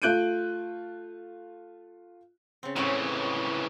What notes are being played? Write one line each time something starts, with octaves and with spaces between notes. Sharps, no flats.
A3 F4 F#6 G6 D7 D#7
C#3 C4
A2 C#3 E3 C4 C#4